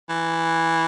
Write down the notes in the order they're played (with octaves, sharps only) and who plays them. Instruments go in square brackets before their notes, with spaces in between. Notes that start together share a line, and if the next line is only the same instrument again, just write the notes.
[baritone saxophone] E3